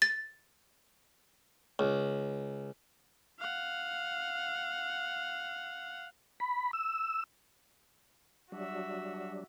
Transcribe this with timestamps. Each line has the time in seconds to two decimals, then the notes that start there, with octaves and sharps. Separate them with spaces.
0.02 A6
1.79 C#2
3.39 F5 F#5
6.40 B5
6.73 E6
8.52 F#3 G3 D4 F#4 E5